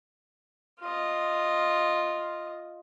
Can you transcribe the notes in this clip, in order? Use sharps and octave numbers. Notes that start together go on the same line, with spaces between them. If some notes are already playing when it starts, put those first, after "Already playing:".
F4 D#5